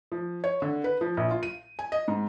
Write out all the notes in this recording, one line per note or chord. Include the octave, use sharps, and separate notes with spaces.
F3
C#5
D3
B4
F3
A#1
F4
D#7
G#5
D#5
G#2